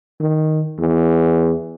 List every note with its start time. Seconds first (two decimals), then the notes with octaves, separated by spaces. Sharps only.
0.20 D#3
0.79 E2